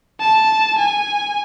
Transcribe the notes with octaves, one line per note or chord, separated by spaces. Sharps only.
A5
G#5